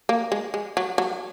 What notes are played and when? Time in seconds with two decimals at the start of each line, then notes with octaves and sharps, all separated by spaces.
0.09 A#3
0.32 G#3
0.54 G#3
0.77 F#3
0.98 F#3